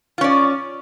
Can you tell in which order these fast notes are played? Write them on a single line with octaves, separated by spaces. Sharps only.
F4 C#4 D5